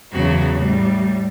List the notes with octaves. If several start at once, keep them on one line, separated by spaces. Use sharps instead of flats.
E2 C#3 F#3 F#4
A2 G3